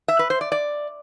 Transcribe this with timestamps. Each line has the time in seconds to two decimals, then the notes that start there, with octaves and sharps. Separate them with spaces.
0.08 E5
0.19 B4
0.30 C5
0.41 D5
0.52 D5